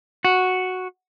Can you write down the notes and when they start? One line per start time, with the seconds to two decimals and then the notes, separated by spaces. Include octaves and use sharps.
0.25 F#4